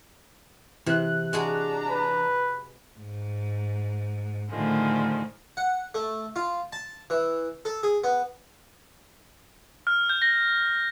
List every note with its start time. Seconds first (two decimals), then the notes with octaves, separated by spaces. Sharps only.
0.86 C3 E3 F#6
1.33 G#3 D4 F#4 G#4 A#5
1.90 B4
2.98 G#2
4.50 A2 D3 D#3 F3 G#3
5.57 F#5
5.94 A3
6.36 F4
6.73 A5
7.10 E3
7.65 A4
7.83 G#4
8.04 B3
9.87 F6
10.09 G6
10.22 A#6